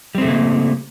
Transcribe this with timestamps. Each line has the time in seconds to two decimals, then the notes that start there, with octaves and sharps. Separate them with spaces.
0.15 G3
0.18 C4
0.21 A3
0.25 C#3
0.28 A#3